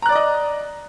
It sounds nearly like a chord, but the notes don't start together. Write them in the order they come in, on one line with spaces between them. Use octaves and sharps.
A#5 F#6 D5 D6 D#5